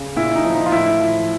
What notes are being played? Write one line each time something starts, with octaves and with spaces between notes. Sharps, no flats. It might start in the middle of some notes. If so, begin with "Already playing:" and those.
Already playing: C#3
A#2 E4
D#4
F3
D#4
F4
A2 E4
F3